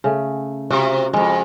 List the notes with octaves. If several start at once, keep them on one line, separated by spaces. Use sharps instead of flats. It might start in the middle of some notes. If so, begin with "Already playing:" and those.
C#3 A3
C3 F4 F#4
F2 A2 G#3